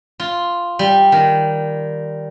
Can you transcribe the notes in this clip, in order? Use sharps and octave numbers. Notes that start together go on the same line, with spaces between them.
F4
G3
D#3